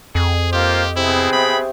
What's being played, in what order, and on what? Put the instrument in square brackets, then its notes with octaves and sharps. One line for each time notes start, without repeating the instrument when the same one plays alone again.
[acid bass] F2 [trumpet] G#4
[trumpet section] A#3 F4 C5 [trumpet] G4 [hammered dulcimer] D#5
[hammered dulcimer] C3 [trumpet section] B3 C4 G#4 [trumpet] E4
[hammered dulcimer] E5 G5 C#6 [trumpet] B5